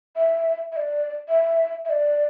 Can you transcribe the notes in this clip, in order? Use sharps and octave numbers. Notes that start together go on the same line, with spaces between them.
E5
E5
D5
E5
E5
D5